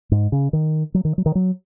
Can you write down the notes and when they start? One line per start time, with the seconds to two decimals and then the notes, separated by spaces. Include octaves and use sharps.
0.12 G#2
0.32 C#3
0.53 D#3
0.94 F#3
1.05 D#3
1.18 F#3
1.26 D#3
1.35 F#3